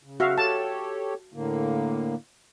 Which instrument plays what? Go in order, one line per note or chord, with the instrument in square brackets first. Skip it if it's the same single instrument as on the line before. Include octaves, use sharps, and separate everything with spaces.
[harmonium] C#3
[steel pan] F#4 E5 F5
[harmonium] G4 A4 C#5 [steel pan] A5
[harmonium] A2 D3 A#3